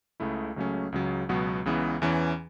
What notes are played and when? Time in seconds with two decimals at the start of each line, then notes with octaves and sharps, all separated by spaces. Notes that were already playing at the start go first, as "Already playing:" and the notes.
0.20 C#2 C#3 A3 E4
0.56 C#2 C#3 F#3 A3 C#4
0.92 C#2 C#3 F#3
1.29 C#2 B2 F#3 B3 F#4
1.65 C#2 C#3 E3 B3
2.02 E2 E3 C#4